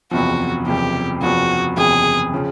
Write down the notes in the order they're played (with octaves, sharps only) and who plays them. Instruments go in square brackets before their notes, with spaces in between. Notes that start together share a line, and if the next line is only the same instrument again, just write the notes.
[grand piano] F#1 E2 C3 F3 [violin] F#4
[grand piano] F#1 E2 C3 F3 [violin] G4
[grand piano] F#1 E2 C3 F3 [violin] F#4
[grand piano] F#1 E2 C3 F3 [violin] G#4
[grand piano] C#3 F3